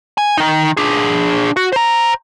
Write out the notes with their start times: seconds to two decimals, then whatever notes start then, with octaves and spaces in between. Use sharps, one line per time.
0.18 G#5
0.38 D#3 D#4
0.77 D4 G#4
1.56 F#4
1.72 C5 A#5